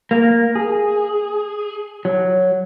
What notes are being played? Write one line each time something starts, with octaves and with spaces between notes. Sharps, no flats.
A#3
G#4
F#3